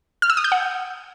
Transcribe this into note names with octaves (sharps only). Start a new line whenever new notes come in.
F6
E6
D#6
G6
F#5